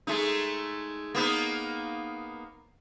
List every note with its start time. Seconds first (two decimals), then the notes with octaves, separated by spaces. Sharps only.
0.07 G#3 A3 D#4
1.15 A#3 B3 D#4